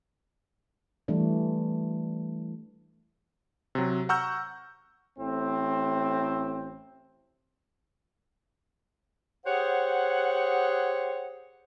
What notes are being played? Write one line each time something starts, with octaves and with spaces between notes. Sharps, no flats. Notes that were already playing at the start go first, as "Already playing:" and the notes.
E3 G3 A3 D4
C3 F#3
F#5 A#5 C#6 E6 F6 G6
A1 A2 C4
G4 G#4 C5 C#5 F#5